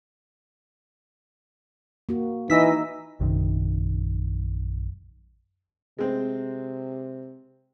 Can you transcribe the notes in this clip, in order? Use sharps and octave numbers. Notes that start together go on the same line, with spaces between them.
A#3 F#4
E3 D#4 D#5 E6 B6
A#1 F#2 C3 D#3
C3 G#3 C4